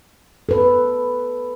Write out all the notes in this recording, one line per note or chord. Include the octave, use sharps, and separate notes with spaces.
A4 B4